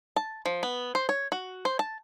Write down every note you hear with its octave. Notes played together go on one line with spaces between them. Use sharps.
A5
F3
B3
C5
C#5
F#4
C5
A5